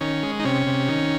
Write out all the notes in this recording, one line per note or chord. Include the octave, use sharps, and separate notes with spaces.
D#3 C#4
G#3
D#4
C3 C#4
C3
D#3